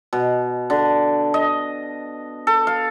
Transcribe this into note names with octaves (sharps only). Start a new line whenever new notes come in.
B2
D3
D#5
A4
F5